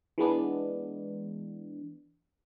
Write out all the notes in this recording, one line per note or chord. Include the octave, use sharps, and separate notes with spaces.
E3 G#3 B3 D4